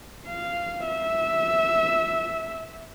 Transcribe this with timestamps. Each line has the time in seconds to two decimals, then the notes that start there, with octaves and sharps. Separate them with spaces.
0.27 F5
0.87 E5